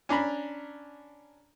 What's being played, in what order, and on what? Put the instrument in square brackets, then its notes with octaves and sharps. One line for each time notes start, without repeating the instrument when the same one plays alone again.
[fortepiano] C#4 D4 A#5 B5